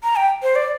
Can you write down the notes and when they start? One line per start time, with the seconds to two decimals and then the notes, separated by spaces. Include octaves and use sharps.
0.03 A#5
0.16 G5
0.43 C5
0.56 D5